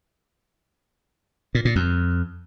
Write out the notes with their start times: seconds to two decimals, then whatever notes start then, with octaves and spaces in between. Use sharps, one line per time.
1.55 A#2
1.65 A#2
1.76 F2